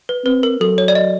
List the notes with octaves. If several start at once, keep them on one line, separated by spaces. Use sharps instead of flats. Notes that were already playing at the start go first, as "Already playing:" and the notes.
B4
C4 B4
A#4
F#3 A4
C#5
D5
D#5